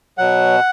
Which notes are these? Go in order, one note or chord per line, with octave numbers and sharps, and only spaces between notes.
B2 F#3 F#5